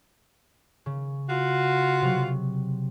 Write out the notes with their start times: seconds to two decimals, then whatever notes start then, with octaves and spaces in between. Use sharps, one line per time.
0.86 C#3
1.30 F4 F#4
2.02 C3 F#3